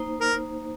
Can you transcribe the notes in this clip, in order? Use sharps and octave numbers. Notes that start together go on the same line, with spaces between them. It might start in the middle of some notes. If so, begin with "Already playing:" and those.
Already playing: A#3 D#4 C5
A#4